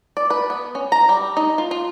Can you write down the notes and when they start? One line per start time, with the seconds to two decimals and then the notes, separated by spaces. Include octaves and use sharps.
0.17 D5
0.30 B4
0.50 B3
0.75 C#4
0.92 A#5
1.09 G3
1.37 D#4
1.58 F4
1.71 F4